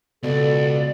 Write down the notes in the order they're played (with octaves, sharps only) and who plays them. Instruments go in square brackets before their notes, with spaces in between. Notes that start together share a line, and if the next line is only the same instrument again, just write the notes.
[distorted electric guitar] C#2 [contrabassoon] B2 [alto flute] A4 [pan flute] D5